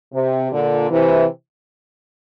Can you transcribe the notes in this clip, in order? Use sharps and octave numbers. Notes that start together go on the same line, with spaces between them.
C3
A#2 D3
C3 E3